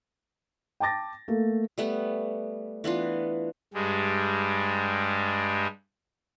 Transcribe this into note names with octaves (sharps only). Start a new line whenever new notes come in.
G5 A5 D6 A6 A#6
A3 A#3 A4
G3 A3 B3
E3 B3 D4 F4
G2 G3 G#3